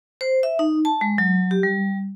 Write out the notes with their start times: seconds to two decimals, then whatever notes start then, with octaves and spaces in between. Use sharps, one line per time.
0.21 C5
0.43 E5
0.59 D#4
0.85 A5
1.01 G#3
1.18 F#3
1.51 G4
1.63 G3